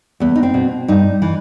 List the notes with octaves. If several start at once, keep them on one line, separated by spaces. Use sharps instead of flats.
E2 B3
D#4
C4
B2
G2 D#4
E3